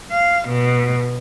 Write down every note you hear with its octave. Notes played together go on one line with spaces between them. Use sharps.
F5
B2